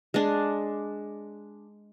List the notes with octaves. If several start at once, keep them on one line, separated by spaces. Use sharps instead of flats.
G#3 D4